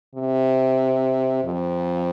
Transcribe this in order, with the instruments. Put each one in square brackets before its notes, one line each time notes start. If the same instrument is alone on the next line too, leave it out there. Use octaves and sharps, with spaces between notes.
[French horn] C3
F2